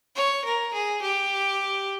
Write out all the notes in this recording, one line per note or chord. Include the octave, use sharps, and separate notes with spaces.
C#5
A#4
G#4
G4